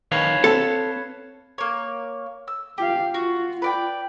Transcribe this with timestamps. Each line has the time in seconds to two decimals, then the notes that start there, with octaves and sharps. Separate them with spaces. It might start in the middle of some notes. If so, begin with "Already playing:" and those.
0.12 D#3 B4 C#5 F5
0.44 C4 A4
1.58 A#3 C#5
2.48 E6
2.78 F4 G4 F5
3.14 F4 F#4
3.62 B4 D5 G5